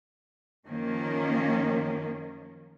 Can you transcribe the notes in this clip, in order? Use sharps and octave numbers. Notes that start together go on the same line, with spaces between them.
F#2 D#3 F3 A#3 C#4